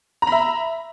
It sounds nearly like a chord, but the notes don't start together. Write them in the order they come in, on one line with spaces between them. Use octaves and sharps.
A#5 B5 E5